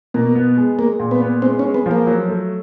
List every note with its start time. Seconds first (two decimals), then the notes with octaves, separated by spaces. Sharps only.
0.14 B2 A#3
0.35 B3
0.57 G#3
0.79 G#3 A#3
1.00 A#2
1.11 B3
1.21 B3
1.42 G#3 C4
1.59 C#4
1.64 G#3
1.74 B3
1.86 F3
1.91 A#3
2.07 F#3
2.28 A3